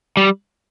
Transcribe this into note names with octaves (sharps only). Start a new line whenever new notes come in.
G3